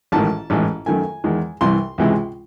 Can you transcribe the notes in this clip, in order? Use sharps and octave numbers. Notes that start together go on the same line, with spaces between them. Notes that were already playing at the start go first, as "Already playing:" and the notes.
A1 G#2 D#3 A5
A1 G#2 E3
F#2 D#3 A3 G#5
E2 D#3 G#3
C2 C3 E3 C6
C#2 C3 E3 G#3